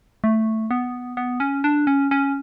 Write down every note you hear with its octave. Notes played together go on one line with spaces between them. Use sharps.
A3
B3
B3
C#4
D4
C#4
C#4